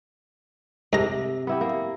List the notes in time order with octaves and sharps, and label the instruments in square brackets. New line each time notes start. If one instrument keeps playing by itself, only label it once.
[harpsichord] G#2 A#5 [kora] C3
[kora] B3 E4 G4
A#3